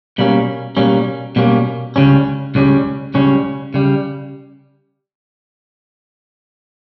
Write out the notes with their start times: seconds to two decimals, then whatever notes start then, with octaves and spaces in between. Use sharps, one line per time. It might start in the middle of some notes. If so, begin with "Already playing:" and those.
0.18 B2 G3 A#3 C#4
0.77 B2 G3 A#3 C#4
1.36 B2 G3 A#3 C#4
1.96 C#2 C#3 G3 C#4
2.55 C#2 C#3 G3 C#4
3.14 C#2 C#3 G3 C#4
3.74 C#3 G3